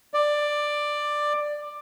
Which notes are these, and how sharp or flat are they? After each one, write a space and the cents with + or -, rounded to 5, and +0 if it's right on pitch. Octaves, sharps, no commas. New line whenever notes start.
D5 +10